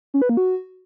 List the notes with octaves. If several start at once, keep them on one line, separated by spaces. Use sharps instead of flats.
C#4
B4
A#3
F#4